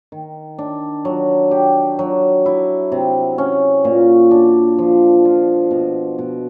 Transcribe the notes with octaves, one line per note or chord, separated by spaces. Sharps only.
D#3
D4
F#3
G4
F#3
E4
C3
C#4
A#2
D4
F3
F4
B2
B2